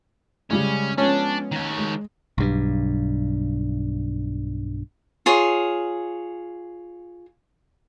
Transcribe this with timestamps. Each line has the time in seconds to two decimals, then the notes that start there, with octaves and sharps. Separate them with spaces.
0.51 C#3 G3 G#3 C#4
0.98 F3 G#3 B3 C#4 D4
1.52 D#3 C#5
1.78 G#3
2.38 B1 G2
5.26 F4 G#4 C#5